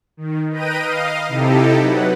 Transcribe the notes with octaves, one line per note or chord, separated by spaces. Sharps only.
D#3
B4 D#5 G5 A#5 D#7
D#5 F5
C3 D#4 E4 G4 A4
F#3 B4 F#5